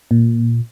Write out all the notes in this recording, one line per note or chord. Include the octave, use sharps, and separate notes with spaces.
A#2